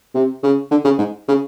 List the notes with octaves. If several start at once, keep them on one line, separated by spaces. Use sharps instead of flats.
C3
C#3
D3
C#3
G#2
C#3